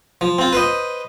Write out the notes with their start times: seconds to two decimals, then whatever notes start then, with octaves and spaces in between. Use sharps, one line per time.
0.21 F3
0.39 C4 F4
0.53 B4 C5 D#5